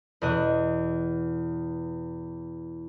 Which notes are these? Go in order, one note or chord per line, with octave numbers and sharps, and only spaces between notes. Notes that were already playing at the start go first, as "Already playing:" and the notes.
E2 B2 D#5 F#6